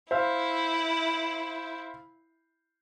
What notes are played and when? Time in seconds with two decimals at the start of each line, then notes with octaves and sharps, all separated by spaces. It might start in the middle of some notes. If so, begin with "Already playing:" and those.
0.11 E4 C5 E5 F5